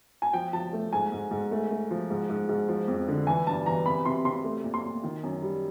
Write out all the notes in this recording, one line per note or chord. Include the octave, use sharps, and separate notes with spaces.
G#5
F3 G5
F3 A5
A3
G#2 G#5
G#2
G#2
A3
A3
F3
G#2
G#2
G#2
F3
F2
D3
E3 G#5
G2 A5
E3 A#5
C3 B5
C3 C6
C3 C6
A3
A#2
C6
A#2
D#3
F#2
G3